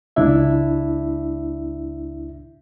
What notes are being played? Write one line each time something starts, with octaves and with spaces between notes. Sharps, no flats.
C#2 D4 E4 E5